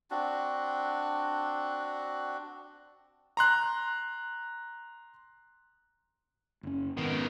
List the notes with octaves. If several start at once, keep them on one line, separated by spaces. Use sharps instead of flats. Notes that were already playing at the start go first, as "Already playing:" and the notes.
C4 D4 F#4
A#5 C6 F#6
F#1 C#4
G#1 B2 D#3